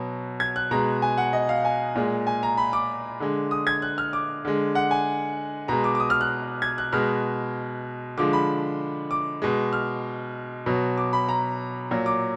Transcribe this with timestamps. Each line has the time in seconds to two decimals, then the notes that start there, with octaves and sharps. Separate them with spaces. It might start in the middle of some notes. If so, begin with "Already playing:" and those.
Already playing: B2 F#3
0.40 G#6
0.56 F#6
0.71 B2 G#3 A#5
1.02 G#5
1.18 F#5
1.33 D#5
1.49 F5
1.65 G#5
1.96 A#2 G#3
2.27 G#5
2.43 A#5
2.58 B5
2.73 D6
3.20 D3 G#3
3.51 D#6
3.67 G#6
3.82 F#6
3.98 F6
4.13 D6
4.45 D3 G#3
4.75 F#5
4.91 G#5
5.68 B2 G#3 A#5
5.84 D6
5.95 D6
6.00 D#6
6.10 F6
6.21 F#6
6.62 G#6
6.78 F#6
6.93 B2 G#3 F6
8.17 D3 F3 G#3 D6
8.33 B5
9.11 D6
9.42 B2 G#3
9.73 F6
10.66 B2 F#3
10.98 D6
11.13 B5
11.29 A#5
11.91 A#2 F#3
12.06 D6